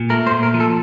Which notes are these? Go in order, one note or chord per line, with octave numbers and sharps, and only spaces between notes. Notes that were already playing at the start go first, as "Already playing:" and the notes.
Already playing: A#2
A3 A#4
C5
A#2
A#4
F3
A4